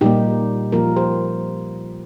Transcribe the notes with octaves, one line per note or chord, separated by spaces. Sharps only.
A#2 G3 A#3 D#4 G4
A#2 F3 A#3 F4 A#4
G4 C5